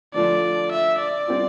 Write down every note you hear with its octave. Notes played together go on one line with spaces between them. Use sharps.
D3 F3 A3 D4 F4 D5
E5
D5
G3 C4 F4